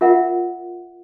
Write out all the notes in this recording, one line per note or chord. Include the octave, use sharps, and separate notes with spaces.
F4 A#4 E5 F#5